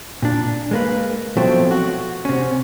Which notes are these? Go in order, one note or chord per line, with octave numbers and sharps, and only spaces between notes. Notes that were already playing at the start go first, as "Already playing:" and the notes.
A#2 D4
G#3 A#3 B4
B2 F3 F#3 A3 C4
F#4
C3 C#4